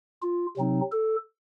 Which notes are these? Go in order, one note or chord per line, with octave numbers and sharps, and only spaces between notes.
F4
C3 F#3 C4 D#4
A4